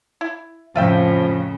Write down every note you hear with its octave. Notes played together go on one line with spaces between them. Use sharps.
E4
F2 A2 C#3 F3 F4 E5 G5